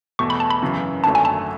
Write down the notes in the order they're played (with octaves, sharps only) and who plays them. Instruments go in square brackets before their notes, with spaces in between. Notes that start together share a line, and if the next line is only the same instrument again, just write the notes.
[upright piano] E2 B2 A3 [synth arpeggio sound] C#6
[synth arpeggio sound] B5
A5
B5
[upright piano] F#1 F#2 C#3 E3
[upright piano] G#1 F#2 D3 A3 [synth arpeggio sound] A5
[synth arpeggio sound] G#5
A5